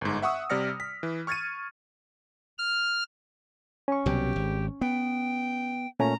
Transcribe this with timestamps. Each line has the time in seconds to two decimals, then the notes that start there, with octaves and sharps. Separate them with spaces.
0.01 G1 G#2
0.22 E5 F#5 C#6 D#6 E6
0.50 C3 G3 D5 F6 A#6 C#7
0.80 B6
1.03 E3
1.27 C#6 F6 G#6 A6 C#7 D#7
2.58 F6
3.88 C#4 C#6
4.06 C2 B2 F#3 G4
4.36 G#1
4.81 B3 G5
6.00 A#2 A3 C#4 A#5